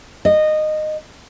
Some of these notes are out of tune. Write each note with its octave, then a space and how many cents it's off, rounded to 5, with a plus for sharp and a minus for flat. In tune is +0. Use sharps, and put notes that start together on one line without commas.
D#5 -15